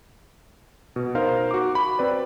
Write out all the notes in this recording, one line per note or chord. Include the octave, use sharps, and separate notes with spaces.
B2
D#4 A#4 C5 F5
F#4 D6
B5
C4 B4 D5